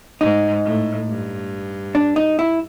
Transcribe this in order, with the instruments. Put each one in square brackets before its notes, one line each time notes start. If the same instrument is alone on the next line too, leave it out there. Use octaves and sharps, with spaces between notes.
[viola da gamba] G#2 [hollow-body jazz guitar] D#4
[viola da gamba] A2
G2
[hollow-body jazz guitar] D4
D#4
E4